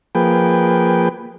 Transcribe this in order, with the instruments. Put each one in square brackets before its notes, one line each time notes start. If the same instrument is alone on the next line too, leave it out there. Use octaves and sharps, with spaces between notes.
[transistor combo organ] F3 A#3 G#4 B4 G5